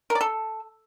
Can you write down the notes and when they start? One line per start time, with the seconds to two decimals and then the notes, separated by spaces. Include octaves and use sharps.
0.10 A#4
0.15 D5
0.21 A4